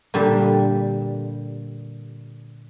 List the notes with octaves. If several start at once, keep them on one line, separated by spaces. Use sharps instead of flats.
A#2 D3 G3